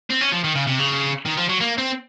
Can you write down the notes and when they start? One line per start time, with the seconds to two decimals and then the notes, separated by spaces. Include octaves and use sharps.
0.10 C4
0.21 C#4
0.32 F3
0.44 D#3
0.55 C#3
0.67 C3
0.79 C#3
1.26 D#3
1.37 F3
1.49 F#3
1.60 A#3
1.78 C4